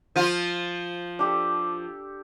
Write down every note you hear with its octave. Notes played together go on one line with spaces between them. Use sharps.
F3 F4
D4 G4 A4